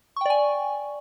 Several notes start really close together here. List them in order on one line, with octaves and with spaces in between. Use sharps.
C#6 G5 D5 G#5